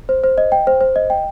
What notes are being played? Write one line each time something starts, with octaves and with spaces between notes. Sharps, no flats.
C5
C5
D#5
G5
C5
C5
D#5
G5